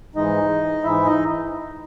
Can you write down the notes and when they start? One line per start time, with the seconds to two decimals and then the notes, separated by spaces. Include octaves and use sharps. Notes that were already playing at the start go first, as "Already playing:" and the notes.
0.15 G#2 E3 G#3 D#4 D#5
0.83 G#2 E3 G#3 E4 E5
1.05 D#4 D#5